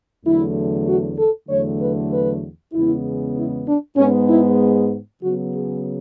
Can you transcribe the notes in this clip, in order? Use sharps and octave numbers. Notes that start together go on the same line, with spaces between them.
E2 D3 F#3 A3 E4
F#4
A4
E2 D3 F#3 A3 C#5
B4
B4
E2 C#3 G#3 B3 E4
E4
D4
G#2 G#3 B3 C#4
E4
C#3 F#3 B3 F#4
G#4